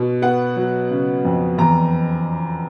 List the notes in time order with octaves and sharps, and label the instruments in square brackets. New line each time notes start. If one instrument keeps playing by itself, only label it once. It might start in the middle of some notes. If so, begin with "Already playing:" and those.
Already playing: [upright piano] B2
B3 F#5
F#3
C#3
F2
E2 A#5